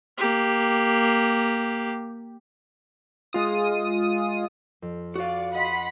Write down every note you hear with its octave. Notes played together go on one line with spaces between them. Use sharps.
A#3 G4
G#3 F4 D#6
F2
F#4 D5 F5
D#5 F#5 B5 C6 B6